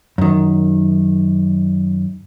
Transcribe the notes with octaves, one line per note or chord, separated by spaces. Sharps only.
F#2 D#3